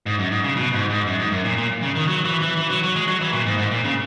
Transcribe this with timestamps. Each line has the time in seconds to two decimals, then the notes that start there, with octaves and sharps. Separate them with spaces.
0.06 G#2
0.19 F#2
0.31 G#2
0.44 C#3
0.56 B2
0.74 G#2
0.90 G#2
1.07 F#2
1.19 G#2
1.32 F#2
1.45 A#2
1.58 A#2
1.82 C#3
1.95 D#3
2.07 F#3
2.25 E3
2.41 E3
2.58 E3
2.71 F#3
2.83 F#3
2.96 G#3
3.08 F#3
3.21 E3
3.33 A#2
3.46 G#2
3.58 G#2
3.71 A#2
3.84 C#3